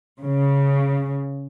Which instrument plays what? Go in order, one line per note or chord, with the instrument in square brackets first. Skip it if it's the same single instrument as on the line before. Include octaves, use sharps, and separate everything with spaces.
[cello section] C#3